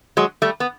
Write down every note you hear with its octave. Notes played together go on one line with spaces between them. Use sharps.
F#3 G#3
G3 A3
B3